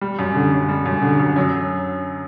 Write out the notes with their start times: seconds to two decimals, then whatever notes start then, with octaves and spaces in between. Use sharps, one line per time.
0.01 G3
0.19 F#2
0.35 D3
0.52 F#2
0.69 G3
0.86 F#2
1.02 D3
1.20 F#2
1.36 F#3